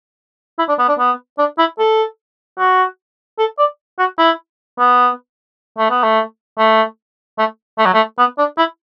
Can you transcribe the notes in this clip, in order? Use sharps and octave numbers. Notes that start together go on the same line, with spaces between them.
E4
D4
B3
D4
B3
D4
E4
A4
F#4
A4
D5
F#4
E4
B3
A3
B3
A3
A3
A3
A3
F#3
A3
B3
D4
E4